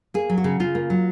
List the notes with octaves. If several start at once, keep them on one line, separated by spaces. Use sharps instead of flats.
A#3 G#4
F#3
F#4
C#3
C#3 F4
A#3
F#3